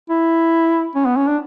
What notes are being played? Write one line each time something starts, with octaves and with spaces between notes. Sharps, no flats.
E4
C#4
B3
C#4
D4